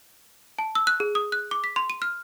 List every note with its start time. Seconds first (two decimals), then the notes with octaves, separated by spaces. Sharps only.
0.59 A5
0.75 E6
0.87 F#6
1.00 G#4
1.15 D#6
1.32 F#6
1.51 D6
1.64 B6
1.76 C6
1.90 D#7
2.02 F6